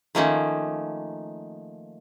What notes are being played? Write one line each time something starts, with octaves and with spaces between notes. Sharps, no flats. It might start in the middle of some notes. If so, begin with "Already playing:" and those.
D#3 F3 A3 A#3 C#4 D#4